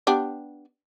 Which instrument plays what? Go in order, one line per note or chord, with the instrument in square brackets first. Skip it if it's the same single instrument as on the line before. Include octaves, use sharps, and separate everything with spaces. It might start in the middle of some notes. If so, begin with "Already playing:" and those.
[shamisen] B3 D4 G4